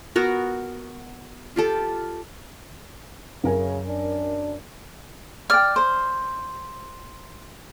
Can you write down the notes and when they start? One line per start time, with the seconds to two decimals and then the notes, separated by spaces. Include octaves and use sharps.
0.16 B3 F#4 A#4
1.56 F4 G4 A4
3.44 F#2 C#3 A#4 G#5
3.89 D4
5.50 D5 G5 F6
5.76 C5